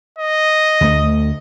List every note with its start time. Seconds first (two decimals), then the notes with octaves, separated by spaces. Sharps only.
0.18 D#5
0.81 D2 A3